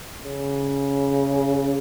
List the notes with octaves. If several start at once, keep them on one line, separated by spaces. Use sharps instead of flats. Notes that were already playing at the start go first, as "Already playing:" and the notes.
C#3